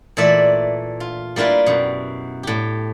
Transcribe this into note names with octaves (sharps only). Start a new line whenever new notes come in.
A#2 E3 A3 D5 E5 B5
F4
G3 A#3 E4 F4 B4
F#2 B2
A2 G4